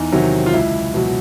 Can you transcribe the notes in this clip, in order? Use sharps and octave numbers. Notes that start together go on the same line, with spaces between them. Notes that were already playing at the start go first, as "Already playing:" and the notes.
Already playing: E2 D#4
C3 D#3 F#3
F4
C#2 E4
B2 F#3